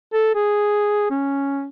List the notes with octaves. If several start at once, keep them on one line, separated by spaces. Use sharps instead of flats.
A4
G#4
C#4